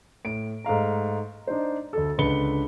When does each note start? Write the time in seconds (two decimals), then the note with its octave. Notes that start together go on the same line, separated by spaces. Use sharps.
0.25 A2 D7
0.64 G#2 A3 F5 A#5
1.47 D4 D#4 C5
1.93 D2 A4
2.18 C#2 D3 B4 B5 C#7 G7